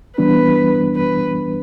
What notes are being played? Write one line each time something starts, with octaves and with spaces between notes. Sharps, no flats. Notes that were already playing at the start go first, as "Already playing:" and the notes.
E3 G3 B3 D4 B4
B4